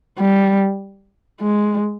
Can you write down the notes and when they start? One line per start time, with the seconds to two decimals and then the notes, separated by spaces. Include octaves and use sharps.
0.20 G3
1.41 G#3